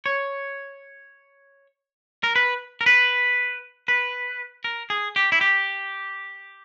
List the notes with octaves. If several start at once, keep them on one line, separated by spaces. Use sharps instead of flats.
C#5
A#4
B4
A#4
B4
B4
A#4
G#4
G4
E4
G4